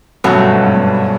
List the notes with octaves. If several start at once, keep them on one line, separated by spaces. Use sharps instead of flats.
F#2 B2 F#3 A3
G2
G#2
G2
G2